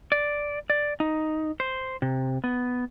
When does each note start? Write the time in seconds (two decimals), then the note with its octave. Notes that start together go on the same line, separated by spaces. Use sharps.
0.12 D5
0.70 D5
1.00 D#4
1.60 C5
2.02 C3
2.44 B3